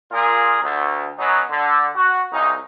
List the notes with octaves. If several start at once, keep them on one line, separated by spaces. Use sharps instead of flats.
A#2 F4 G#4 A#4
D2
F#3 B3 C#4 D#4
D3
F#4
C2 C#3 D#4